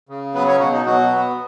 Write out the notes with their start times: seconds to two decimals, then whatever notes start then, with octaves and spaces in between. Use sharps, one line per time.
0.09 C#3
0.34 F#3 B3 B4
0.47 C#4 C#5
0.60 B2 F#3 F#4
0.73 D#4
0.86 B2 F#3 F#4
1.12 B3